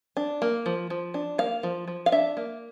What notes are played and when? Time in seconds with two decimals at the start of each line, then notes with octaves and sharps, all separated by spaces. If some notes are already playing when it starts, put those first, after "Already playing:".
0.17 D4
0.42 A#3
0.66 F3
0.90 F3
1.14 D4
1.38 A#3 F5
1.63 F3
1.88 F3
2.06 F5
2.12 D4 E5
2.37 A#3